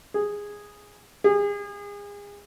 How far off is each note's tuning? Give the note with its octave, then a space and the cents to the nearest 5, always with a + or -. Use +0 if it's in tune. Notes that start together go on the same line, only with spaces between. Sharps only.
G#4 -10
G#4 -35